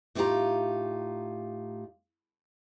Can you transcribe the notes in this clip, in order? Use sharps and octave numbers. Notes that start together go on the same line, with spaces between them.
A2 A#3 D#4 F4 G4 A#5